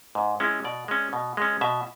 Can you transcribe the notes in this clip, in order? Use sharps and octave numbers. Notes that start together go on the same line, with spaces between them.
G#2
G#3 C#4 E4
B2 D5
G#3 C#4
B2
G#3 C#4
B2 E5